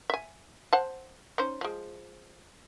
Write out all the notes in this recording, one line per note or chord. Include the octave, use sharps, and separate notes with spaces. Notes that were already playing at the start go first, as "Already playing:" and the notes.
E5 G#5
C5 F#5 A5
C#4 D#4 C5
F3 G#3